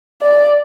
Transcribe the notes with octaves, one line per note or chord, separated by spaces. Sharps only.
D5